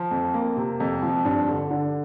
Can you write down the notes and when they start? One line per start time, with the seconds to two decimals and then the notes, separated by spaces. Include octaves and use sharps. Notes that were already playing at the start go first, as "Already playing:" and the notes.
Already playing: F3
0.11 F2
0.34 A#3
0.57 C3
0.80 F2
1.02 F3
1.25 G2
1.49 D3
1.71 D3